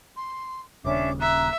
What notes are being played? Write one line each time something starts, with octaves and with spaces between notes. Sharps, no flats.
C6
D#1 C#3 C#4 D4 E5 D6
E5 A#5 F#6